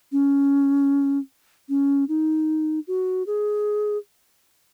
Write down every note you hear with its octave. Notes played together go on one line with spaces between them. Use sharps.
C#4
C#4
D#4
F#4
G#4